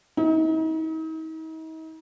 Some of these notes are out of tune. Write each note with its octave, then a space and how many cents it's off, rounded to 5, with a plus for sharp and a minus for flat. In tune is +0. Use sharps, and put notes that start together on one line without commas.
D#4 +40